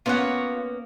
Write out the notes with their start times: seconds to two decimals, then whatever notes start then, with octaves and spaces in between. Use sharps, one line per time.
0.06 A#3 B3 C#4 F4 C#5 F#5